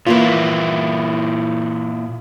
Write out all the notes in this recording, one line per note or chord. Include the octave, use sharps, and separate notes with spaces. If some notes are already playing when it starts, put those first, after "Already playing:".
A#2 E3 A#3 E4 F4